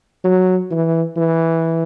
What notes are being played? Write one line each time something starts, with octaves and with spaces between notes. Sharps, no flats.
F#3
E3
E3